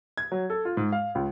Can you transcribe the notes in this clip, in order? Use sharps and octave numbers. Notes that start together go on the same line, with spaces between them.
G#6
F#3
A4
F4
G#2
F5
C#2